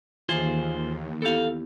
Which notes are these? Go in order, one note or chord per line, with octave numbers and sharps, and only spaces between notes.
D#2 E3 F4 G#4 C5
B3 E4 G4 A4 F5